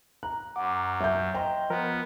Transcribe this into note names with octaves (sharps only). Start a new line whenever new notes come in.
A#5 F#6
F#2 F#5 D6
F#3 E5 G6
C5 D#5 G5 A#5 C6
F3 B3 A#4 F6